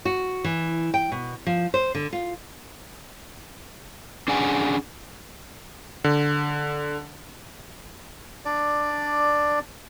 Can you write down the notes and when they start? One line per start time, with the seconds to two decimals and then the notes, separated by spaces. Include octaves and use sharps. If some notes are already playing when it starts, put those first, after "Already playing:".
0.05 F#4
0.44 E3
0.94 G5
1.12 B2
1.47 F3
1.74 C5
1.95 D3
2.13 F4
4.28 C#4 D4 G#4 D5 F#5 G#5
6.04 D3
8.45 D4 D5